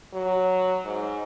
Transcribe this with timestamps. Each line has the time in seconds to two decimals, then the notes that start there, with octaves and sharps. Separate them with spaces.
0.13 F#3
0.85 G#2